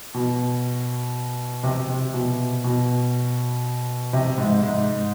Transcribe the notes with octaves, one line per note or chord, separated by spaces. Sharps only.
B2
C3
C3
B2
B2
C3
G#2
G#2